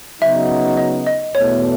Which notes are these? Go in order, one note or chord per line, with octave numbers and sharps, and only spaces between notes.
C#3 F#3 B3 D#4 E5
D#5
D#5
E2 B2 A3 C#5